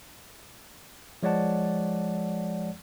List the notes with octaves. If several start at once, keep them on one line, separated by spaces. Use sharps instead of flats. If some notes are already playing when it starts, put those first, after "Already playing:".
F3 G#3 C#5 D5 F#5 A5